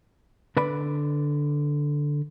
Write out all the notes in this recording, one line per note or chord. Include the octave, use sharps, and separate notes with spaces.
D3 B4 D5 B5